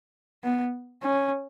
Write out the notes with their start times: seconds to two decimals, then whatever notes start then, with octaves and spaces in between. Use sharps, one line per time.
0.44 B3
1.03 C#4